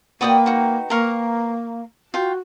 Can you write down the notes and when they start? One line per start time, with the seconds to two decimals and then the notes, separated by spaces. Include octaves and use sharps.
0.21 A#3 F#4 B4 D5 G5 D#6
0.46 D#4 F#4
0.90 A#3 A#4 F5 C#6
2.14 F4 F#4 G5